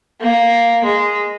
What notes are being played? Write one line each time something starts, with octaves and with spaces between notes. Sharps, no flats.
A#3
G#3